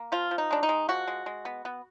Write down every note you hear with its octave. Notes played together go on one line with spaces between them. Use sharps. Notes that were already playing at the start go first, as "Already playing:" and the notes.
Already playing: A#3
F3 F4
F3
D#4
G#3 D4
D#4
G#3
F3 F#4
G#3
G#3
B3
B3